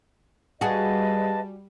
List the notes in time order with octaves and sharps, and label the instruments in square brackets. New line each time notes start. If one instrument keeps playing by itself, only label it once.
[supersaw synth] G3 [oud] F#4 G#4 [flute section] B4 D#5 F5 [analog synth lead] A5